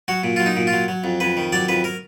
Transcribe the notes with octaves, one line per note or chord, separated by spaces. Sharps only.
F#3 F#4
A#2
F#3 F4
D#4
A#2
F4
F#3
F#3
F2
F2 B4
D#3
F#3 D5
F2 B4
A#4